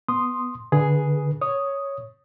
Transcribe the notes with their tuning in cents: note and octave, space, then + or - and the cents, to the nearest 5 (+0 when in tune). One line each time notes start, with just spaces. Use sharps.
B3 +0 C6 +0 D#6 -5
D3 +0 G#4 +0 B4 -10
C#5 +0 D#6 +0